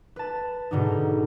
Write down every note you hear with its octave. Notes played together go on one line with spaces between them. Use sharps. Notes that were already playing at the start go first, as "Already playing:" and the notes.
B4 A5
G#2 B2 D3 D#4